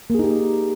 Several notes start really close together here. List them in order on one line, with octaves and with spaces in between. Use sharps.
A#3 G#4 D#4 G4